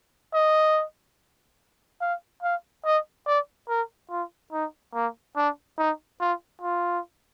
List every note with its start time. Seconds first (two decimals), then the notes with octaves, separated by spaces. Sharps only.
0.34 D#5
2.01 F5
2.43 F5
2.85 D#5
3.27 D5
3.69 A#4
4.10 F4
4.52 D#4
4.94 A#3
5.36 D4
5.78 D#4
6.20 F4
6.62 F4